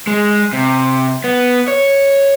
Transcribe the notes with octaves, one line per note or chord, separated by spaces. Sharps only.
G#3
C3
B3
C#5